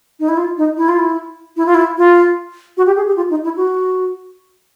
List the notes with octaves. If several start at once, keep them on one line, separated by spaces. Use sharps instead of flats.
D#4
E4
F4
D#4
E4
F4
E4
E4
F4
E4
F4
F#4
G4
G#4
G4
F4
D#4
E4
F#4